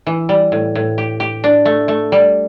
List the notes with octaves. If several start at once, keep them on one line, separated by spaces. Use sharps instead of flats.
E3
G3
A2
A2
G4
G4
D4
A3
A3
G3